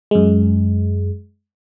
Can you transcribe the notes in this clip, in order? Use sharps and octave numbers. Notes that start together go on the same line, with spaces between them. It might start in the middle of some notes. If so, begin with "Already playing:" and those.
F#2 G#3